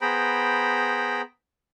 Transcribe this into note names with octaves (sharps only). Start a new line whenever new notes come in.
B3 G#4 C5 G5 A#5 B5